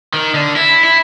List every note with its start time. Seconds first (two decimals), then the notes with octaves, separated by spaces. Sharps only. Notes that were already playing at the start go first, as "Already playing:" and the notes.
0.14 D#3
0.35 D3
0.56 E4
0.84 E4